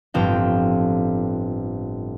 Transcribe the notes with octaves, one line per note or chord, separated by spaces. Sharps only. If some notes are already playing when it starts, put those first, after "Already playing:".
G1 A2 F3 C4 F5 G5